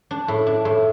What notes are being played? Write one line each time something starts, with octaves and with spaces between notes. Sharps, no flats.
D4
A2
D4
A2